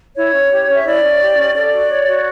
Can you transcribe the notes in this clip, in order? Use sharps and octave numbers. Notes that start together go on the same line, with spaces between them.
E4 C#5
C#4
G4
C#4 E5
E4 D5
C#4
G4
C#4
A4 D5
F#4
C#5
F#4